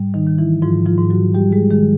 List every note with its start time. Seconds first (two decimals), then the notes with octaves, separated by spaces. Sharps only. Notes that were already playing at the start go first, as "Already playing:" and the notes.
Already playing: G#2 G3
0.14 D#3 D#4
0.27 D#3
0.38 E3 E4
0.62 G#2 F3 F4
0.86 F3 F4
0.98 G#2
1.10 F#3 F#4
1.34 G3 G4
1.52 G#3 G#4
1.70 D#3 G#3 G#4